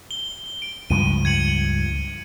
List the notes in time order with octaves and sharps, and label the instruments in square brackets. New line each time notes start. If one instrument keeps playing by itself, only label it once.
[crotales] G7
D7
[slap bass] C#2 G2 F3 [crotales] D#7
[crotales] G#6 C#7 F#7